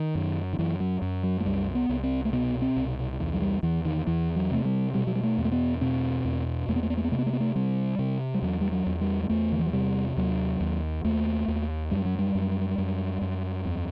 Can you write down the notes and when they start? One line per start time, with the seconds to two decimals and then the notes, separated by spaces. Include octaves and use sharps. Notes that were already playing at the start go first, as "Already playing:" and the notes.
Already playing: D#3
0.15 F#2
0.53 D#3
0.59 F#2 E3
0.80 F#3
1.02 F#2
1.23 F#3
1.40 A3
1.45 C2 G3
1.75 B3
1.89 C2
2.03 C4
2.25 A3
2.33 B2 B3
2.62 C4
2.76 C2
3.20 E2
3.34 F#3
3.42 G3
3.63 E2 E3
3.85 D#3
4.07 E2 E3
4.36 F#3
4.51 C3 A3
4.65 G3
4.94 B2 G3
5.07 F#3
5.15 G3
5.23 A3
5.38 E2
5.45 A3
5.52 B3
5.81 B2 C4
6.25 E2
6.68 E2 A3
6.76 B3
6.83 A3
6.90 B3
6.97 A3
7.04 B3
7.12 C3 A3
7.18 B3
7.26 A3
7.33 B3
7.40 A3
7.55 C3 G3
7.99 C3
8.34 G3
8.42 E2 F#3
8.61 G3
8.72 F#3
8.86 E2
9.01 G3
9.23 G3
9.29 E2 A3
9.52 D#3
9.59 E3
9.66 F#3
9.73 C3 G3
10.17 D#2 F#3
10.61 D#2
11.04 D#2 A3
11.48 D#2
11.91 F#2 G3
12.05 F#3
12.19 G3
12.35 F#2
12.78 F#2
13.22 F#2
13.65 E2